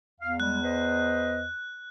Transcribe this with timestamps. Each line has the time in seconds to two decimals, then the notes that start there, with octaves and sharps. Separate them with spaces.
0.20 E2 F5
0.40 G3 G#3 F#6
0.62 B4 C5 D#5